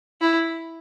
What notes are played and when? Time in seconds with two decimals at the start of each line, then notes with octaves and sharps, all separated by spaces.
0.21 E4